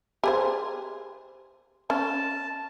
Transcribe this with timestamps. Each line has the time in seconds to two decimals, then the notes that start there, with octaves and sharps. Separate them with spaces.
0.23 G4 G#4 C5
1.90 C#4 A5